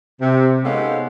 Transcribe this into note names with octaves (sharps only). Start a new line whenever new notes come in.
C3
G#3 B3 C#4 D#4 A4 F5